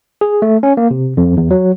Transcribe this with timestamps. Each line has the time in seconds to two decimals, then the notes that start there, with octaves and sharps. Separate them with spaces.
0.21 G#4
0.42 A3
0.63 C#4
0.77 A#3
0.91 C3
1.17 F2
1.37 E2
1.51 F#3